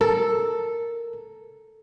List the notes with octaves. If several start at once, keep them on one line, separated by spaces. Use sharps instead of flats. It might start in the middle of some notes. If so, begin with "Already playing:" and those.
A4 A#4